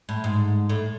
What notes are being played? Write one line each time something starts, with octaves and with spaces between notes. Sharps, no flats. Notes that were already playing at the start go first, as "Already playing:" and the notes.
A2
G#2
A2